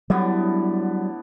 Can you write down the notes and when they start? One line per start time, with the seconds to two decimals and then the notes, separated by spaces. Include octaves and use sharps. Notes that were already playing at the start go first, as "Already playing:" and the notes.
0.10 A2 D3 F#3 G3 B3